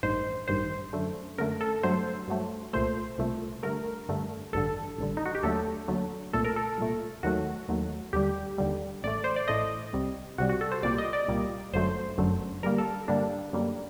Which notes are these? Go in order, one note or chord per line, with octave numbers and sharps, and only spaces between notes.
A1 G2 D#3 C5
A1 G2 D#3 C5
F#2 D3 A3
F#2 D3 A3 A#4
A4
G2 F#3 A3 C5
G2 F#3 A3
C2 A#2 A3 C5
C2 A#2 A3
G2 D3 A3 A#4
G2 D3 A3
A1 G2 D3 A4
A1 G2 D3
D#4
F#4
G4
D#2 D3 F#3 A3 A4
D#2 D3 F#3 A3
C2 A#2 A3 A4
A#4
A4
C2 A#2 A3
D#2 D#3 F#3 A3 F#4
D#2 D#3 F#3 A3
D#2 D3 G3 G4
D#2 D3 G3
A1 A2 A3 D5
C5
D5
A1 A2 A3 D#5
C2 C3 G3
C2 C3 G3 F#4
F#4
A4
C5
C2 A#2 G3 A#3 D5
D#5
D5
C2 A#2 G3 A#3
G1 F#2 D3 F#3 A3 C5
G1 F#2 D3 F#3 A3
G2 D3 G3 A#3 A#4
A4
G2 D3 G3 A#3 D4
F#2 D3 G3 A#3